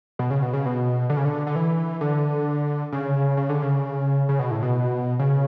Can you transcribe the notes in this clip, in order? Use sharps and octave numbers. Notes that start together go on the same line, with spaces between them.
B2
C#3
B2
C#3
B2
D3
C#3
D3
D3
E3
D3
C#3
C#3
D3
C#3
C#3
B2
A2
B2
C#3